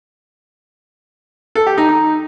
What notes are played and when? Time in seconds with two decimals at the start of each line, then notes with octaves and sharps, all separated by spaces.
1.55 A4
1.66 G4
1.77 D#4
1.89 D#4